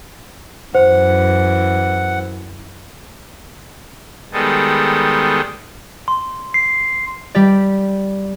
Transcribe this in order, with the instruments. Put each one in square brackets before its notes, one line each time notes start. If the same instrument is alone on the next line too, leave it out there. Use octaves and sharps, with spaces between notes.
[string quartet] F#2 E3 [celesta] C5 [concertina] F#5
[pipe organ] D#3 G3 G#3 B3 G#4 A4
[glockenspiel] C6
C7
[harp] G3 G4 D5